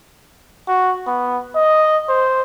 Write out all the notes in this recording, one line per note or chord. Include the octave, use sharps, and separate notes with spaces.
F#4
B3
D#5
C5